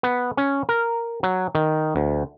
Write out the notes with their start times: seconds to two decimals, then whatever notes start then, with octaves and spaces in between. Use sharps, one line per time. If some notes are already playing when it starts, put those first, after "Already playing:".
0.03 B3
0.37 C#4
0.69 A#4
1.23 F#3
1.55 D#3
1.96 D2